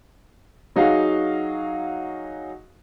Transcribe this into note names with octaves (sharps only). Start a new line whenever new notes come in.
F#3 D#4 F#4 G#4 F5